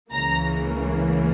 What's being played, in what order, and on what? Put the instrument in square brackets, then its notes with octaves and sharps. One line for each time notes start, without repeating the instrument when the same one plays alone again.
[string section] C#2 C#3 E3 A#3 A#5